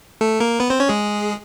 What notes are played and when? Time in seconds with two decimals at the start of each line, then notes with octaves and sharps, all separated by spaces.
0.21 A3 A4
0.40 A#3 A#4
0.60 B3 B4
0.70 C4 C5
0.80 C#4 C#5
0.89 G#3 G#4